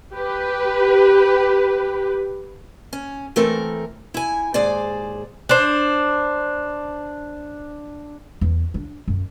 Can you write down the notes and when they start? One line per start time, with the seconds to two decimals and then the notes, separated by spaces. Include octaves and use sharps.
0.13 G4 B4
2.93 C#4
3.36 E3 A3 C4 A4 A#4
4.14 E4 G#5
4.54 D#2 G#2 G#4 C5 D5
5.49 D4 C5
8.41 E2
8.74 D4
9.08 F#2